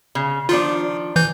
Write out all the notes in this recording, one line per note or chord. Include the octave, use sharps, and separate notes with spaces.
C#3
D#3 F3 D4 F4
E3 G6